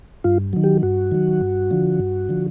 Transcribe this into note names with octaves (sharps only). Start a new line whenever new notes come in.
G2 F4
D#3 F#3
G4
G2 F#4
D#3 F#3
G2
D3 F3
G2
D3 F3